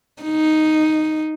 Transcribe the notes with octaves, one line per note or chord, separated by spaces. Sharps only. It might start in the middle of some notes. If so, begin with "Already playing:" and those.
D#4